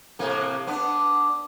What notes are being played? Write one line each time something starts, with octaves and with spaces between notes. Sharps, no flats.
A2 C3 A#3
B3 D4